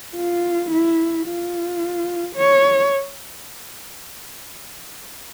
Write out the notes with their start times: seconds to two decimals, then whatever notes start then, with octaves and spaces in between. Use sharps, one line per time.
0.16 F4
0.71 E4
1.26 F4
2.36 C#5